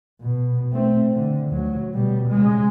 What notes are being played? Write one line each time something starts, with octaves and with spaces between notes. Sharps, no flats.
B2
A3 C4
D3
D2 F#3
B2 G3
C#3 G#3